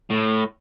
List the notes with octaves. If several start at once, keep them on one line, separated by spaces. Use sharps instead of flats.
A2